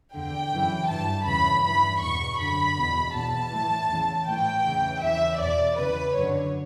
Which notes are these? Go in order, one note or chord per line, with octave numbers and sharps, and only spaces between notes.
E2 D3 G5
F#2 C#3 E3
G2 E3 A5
E2 C#3 E3 B5
G2 E3 B5
E2 B2 C#6
F#2 D3 B5
E2 B2
E2 B2 A5
A2 E3
E2 C#3 E3
A2 E3 G5
E2 C#3 E3
E2 C#3 E3 E5
E2 B2 D5
E2 C#3 E3 B4
F#2 D3 C#5